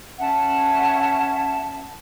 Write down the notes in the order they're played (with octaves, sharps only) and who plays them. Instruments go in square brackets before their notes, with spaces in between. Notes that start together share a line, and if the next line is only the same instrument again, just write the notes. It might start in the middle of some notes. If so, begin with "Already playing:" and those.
[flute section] C#4 E5 F#5 A5